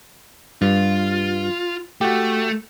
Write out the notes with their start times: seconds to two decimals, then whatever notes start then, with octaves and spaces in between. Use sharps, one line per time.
0.62 G2 F4
2.01 A3 F#4 G4